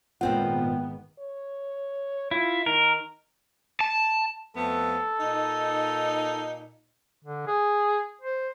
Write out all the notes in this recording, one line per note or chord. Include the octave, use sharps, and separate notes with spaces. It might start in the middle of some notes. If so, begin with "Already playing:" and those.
G#1 A#2 D#3 B3 C4 F4 F#5 G5
C#5
E4 F4
D#3 A#4
A5
F2 A3 B3 A4
A#2 D#4
D3
G#4
C5